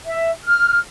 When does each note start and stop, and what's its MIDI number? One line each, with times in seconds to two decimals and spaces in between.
0.05 0.29 76
0.44 0.78 89